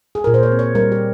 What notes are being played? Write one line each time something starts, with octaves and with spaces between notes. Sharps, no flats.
G#4
A#2 A#4
C5
C#5
C4
C#5
G3 A#4
G4